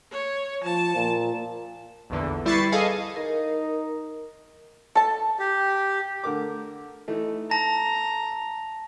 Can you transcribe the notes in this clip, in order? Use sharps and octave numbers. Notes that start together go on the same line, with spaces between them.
C#5
F3 A5
A#2
A#1 E2 D3 E3
G3 E4 B4 C#6 A6 C7
G#4 A4 D#5 F5
D#4 A#4
A4 A5
G4
D3 A#4 D6
E3 A3 D#4
A5 A#5 A#6